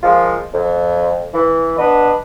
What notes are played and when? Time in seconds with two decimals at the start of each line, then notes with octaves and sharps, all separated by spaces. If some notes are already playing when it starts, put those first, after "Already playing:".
0.03 F3 G#3 A#3 F4
0.53 F2
1.34 E3
1.78 B3 D4 B4 D#5